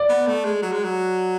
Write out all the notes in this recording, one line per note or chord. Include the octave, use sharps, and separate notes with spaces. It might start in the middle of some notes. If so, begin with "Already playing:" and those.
Already playing: D5
B3
A3
G#3
F#3
G#3
F#3